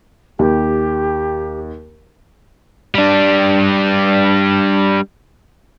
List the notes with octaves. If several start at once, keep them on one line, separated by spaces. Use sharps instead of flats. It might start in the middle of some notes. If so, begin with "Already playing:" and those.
D#2 G4
G3 D4